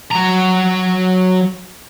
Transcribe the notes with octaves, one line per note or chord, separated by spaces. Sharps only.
F#3 A#5